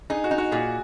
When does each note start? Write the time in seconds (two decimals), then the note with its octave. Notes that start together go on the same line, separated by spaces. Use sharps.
0.10 D#4 G#4
0.24 F#4
0.31 D#4
0.38 F#4
0.51 A#2 G#4